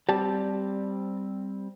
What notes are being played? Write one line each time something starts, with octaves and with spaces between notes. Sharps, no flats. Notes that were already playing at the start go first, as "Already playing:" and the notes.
G3 C4 G4 D5 A5